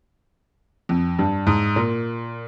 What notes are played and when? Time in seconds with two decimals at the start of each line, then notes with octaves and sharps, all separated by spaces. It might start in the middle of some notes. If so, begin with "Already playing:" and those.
0.89 F2
1.19 G2
1.47 G#2
1.76 A#2